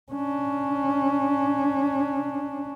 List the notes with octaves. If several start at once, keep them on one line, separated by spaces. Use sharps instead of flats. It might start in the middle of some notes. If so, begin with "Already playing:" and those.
C#4 D4